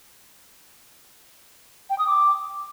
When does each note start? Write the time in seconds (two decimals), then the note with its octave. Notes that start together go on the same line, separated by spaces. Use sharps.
1.90 G5
1.99 D#6
2.07 D6